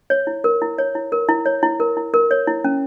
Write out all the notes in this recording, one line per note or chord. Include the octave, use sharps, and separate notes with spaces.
C#5
E4
A#4
E4
C#5
E4
A#4
E4
C#5
E4
A#4
E4
A#4
C#5
E4
C#4